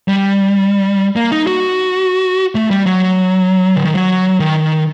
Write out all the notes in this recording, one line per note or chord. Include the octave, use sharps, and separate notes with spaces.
G3
A#3
D#4
F#4
A3
G3
F#3
D3
D#3
F#3
D#3